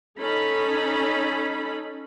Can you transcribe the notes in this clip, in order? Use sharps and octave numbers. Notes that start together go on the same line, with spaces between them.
C#4 D#4 A4 B5